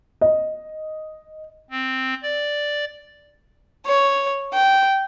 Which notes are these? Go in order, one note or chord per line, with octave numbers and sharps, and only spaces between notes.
D#5
C4
D5
C#5
G5